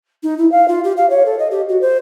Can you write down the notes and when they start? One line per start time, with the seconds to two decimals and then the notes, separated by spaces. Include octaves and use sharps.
0.23 D#4
0.38 E4
0.52 F5
0.68 F4
0.84 G4
0.97 F5
1.10 C#5
1.26 A4
1.39 D#5
1.51 G4
1.69 F#4
1.81 C5